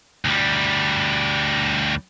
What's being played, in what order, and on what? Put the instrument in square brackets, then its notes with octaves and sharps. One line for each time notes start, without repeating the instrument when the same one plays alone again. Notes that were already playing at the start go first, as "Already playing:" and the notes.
[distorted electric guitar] D2 G3